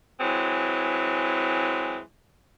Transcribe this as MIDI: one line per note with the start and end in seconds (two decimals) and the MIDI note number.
0.20 1.99 52
0.20 1.99 54
0.20 1.99 56
0.20 1.99 60